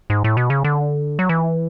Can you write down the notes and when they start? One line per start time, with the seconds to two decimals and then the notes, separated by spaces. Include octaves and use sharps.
0.10 G#2
0.24 A2
0.37 B2
0.50 C#3
0.64 D3
1.19 F#3
1.29 E3